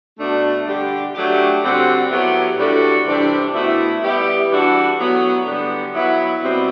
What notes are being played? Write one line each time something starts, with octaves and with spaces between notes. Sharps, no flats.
B2 A3 D4
D3 G3 D4 G4
F#3 A3 D4 G4
D3 G3 C4 F#4
A2 F#3 B3 E4 G4
A2 G3 D4 F#4 A4
C3 E3 G3 D4 G4
B2 A3 E4
G3 B3 E4 G4
E3 G3 D4 F#4 A4
A2 F#3 B3
D3 G3 B3
F#3 B3 E4
B2 G3 C4